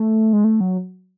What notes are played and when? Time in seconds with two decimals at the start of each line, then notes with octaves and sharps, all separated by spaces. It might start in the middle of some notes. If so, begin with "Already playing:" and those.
Already playing: A3
0.33 G#3
0.44 A3
0.61 F#3